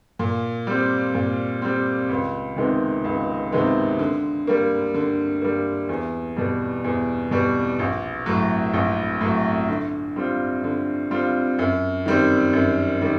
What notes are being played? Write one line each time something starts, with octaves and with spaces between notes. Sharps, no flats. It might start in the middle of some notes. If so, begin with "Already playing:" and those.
A#2
G3 C4
A#2
G3 C4
C#2
C3 D#3 G#3 B3
C#2
C3 D#3 G#3 B3
D3
G3 A#3
D3
G3 A#3
E2
B2 G3
E2
B2 G3
A#1
A2 F#3
A#1
A2 F#3
D3
G3 C4 F4
D3
G3 C4 F4
F#2
D#3 G3 C4
F#2
D#3 G3